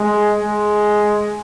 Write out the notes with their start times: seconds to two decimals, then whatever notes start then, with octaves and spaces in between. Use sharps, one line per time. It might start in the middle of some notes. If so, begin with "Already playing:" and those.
Already playing: G#3
0.37 G#3